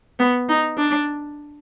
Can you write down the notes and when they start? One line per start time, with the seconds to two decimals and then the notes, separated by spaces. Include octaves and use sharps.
0.19 B3
0.49 D#4
0.77 D4